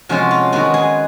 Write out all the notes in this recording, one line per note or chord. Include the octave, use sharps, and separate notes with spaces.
C3 F3 G#3 C#4 F4 F#4
F4
D#3 G#3 B3 F#4
G#4